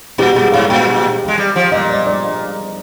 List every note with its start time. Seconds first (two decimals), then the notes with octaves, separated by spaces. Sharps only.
0.18 A#2 G4
0.35 A#2 G#4
0.52 G#2 F5
0.69 A#2 G5
1.28 G#3
1.38 G3
1.56 F3
1.72 A#2 D#5
1.89 D5
2.07 D5